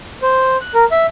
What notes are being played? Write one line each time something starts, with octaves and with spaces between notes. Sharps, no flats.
C5
F#6
A#4
E5